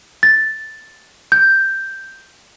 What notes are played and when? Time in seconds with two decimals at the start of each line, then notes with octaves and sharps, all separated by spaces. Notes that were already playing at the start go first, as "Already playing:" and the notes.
0.23 A6
1.32 G6